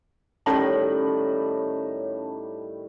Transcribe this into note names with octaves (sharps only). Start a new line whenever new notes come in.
A2 D#3 G3 C#4 C#5 A5